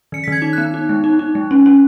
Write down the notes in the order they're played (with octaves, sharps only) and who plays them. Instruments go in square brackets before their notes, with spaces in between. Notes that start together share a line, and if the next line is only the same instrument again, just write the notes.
[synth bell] D#3 C#7
B6
D#3 G#6
D#4
B3 F#6
D#4
G#3
D#4
D#4
G#3
C#4
C#4